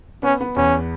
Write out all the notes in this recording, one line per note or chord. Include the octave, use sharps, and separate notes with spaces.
B3 C#4
B3
E2 C#4